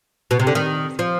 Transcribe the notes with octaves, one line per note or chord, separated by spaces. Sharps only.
B2
C3
D3
D#3
F3